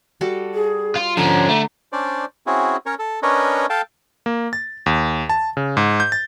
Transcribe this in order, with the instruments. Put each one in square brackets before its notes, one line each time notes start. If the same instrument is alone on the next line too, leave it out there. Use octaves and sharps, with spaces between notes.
[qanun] G3 F#4 A4
[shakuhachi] G#4
[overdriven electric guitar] F4
[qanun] D3 [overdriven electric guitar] F3 C#4 [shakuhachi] A#5
[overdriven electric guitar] A3
[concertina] C#4 D4 C5 D5
C4 C#4 E4 F#4 G#4
C#4 A#4 C#5
A4
C#4 D4 A#4 B4 C#5 D#5
A4 F5 G5 A5
[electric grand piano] A#3
A6
D#2
A5
C#3
G#2
G6
A6